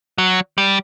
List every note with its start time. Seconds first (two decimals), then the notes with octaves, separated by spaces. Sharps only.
0.18 F#3
0.58 G3